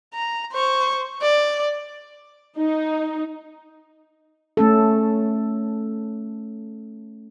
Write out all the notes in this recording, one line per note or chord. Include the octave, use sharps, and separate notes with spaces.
A#5
C5 C#6
D5
D#4
A3 C#4 A4